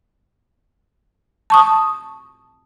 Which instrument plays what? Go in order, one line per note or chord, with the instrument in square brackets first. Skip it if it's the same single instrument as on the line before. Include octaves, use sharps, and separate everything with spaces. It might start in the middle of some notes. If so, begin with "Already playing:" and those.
[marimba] A5 C#6 D#6